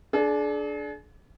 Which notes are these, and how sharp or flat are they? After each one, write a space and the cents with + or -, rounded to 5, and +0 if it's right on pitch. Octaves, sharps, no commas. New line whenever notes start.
D4 +0 G#4 +40